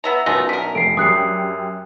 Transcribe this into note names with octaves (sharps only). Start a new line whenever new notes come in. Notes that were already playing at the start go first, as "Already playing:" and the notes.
B3 E5 A#5
B1 F#2 A3 B3 F4 G#5 A#6
D3 A#4 B6
F1 C7 D7
F#2 G4 D#6 F#6 C7 C#7